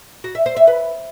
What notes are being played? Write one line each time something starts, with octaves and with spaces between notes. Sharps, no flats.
F#4
E5
C5
E5
B4